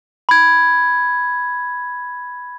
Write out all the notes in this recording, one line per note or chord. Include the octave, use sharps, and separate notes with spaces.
B5 G#6